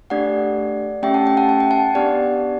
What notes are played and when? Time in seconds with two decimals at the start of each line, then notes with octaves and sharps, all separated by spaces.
0.10 A3 D4 G4 D5 F#5
1.03 A3 C#4 G4 E5 G5
1.14 F#5 A5
1.26 E5 G5
1.37 F#5 A5
1.49 A5
1.60 G5
1.71 F#5 A5
1.95 B3 D4 G4 D5 F#5